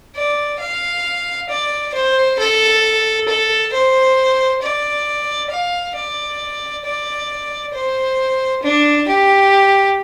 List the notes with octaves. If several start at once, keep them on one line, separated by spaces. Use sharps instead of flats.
D5
F5
D5
C5
A4
A4
C5
D5
F5
D5
D5
C5
D4
G4